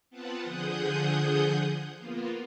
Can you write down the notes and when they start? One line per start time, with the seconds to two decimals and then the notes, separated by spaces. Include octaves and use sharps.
0.10 B3 C4 F4 B4 F#5 A5
0.42 D3 F3 G#4 F#5 D#6 G6
1.97 A#3 B3 F4